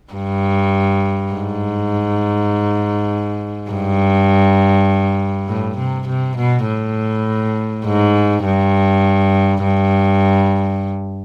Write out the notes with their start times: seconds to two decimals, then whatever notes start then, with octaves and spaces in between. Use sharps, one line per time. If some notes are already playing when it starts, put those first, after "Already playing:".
0.13 G2
1.32 G#2
3.71 G2
5.48 A2
5.78 C3
6.08 C3
6.37 B2
6.67 A2
7.86 G#2
8.46 G2
9.64 G2